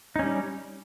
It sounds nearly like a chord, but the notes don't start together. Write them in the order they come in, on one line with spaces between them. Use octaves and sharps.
D#4 C#4 G3